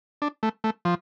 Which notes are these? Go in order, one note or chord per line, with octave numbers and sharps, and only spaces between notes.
D4
A3
A3
F3